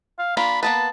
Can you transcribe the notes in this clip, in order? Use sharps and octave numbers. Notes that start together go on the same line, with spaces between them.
F5
A#3 D4 F4 B5
A#3 B3 B4 A5